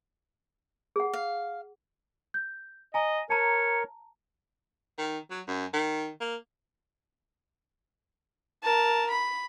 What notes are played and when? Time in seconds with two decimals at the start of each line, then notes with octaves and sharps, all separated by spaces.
0.96 G#4 F#5
1.14 F5
2.34 G6
2.94 D#5 G#5 A#5
3.30 A#4 C#5 A5 A#5
4.98 D#3
5.31 F#3
5.47 F#2
5.74 D#3
6.20 A#3
8.63 A#4 A5
9.10 B5